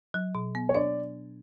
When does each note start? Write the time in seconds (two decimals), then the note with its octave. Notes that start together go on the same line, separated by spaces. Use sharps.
0.14 F#3
0.35 B2
0.55 B3
0.69 C#5
0.75 D4 D5